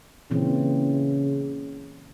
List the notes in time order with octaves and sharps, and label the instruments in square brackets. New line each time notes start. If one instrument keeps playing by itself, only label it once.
[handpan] A#2 E3 C4 [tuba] C#3